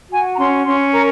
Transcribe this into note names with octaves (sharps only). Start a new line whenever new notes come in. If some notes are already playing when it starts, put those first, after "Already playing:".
F#4 G#5
A#5
C#4 C6
C#4 C6
A#4 A#5